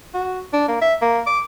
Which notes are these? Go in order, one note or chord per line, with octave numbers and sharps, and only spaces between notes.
F#4
D4
A#3
E5
A#3
D6